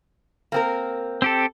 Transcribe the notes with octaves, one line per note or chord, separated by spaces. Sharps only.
A#3 C4 A#4
C4 G4 A4